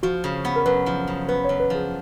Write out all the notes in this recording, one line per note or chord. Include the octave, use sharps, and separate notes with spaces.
F3 F#4
C#3
B3
A#4
F#2 B4
F3
C#3
B3 B4
F#2 C#5
B4
F3 G#4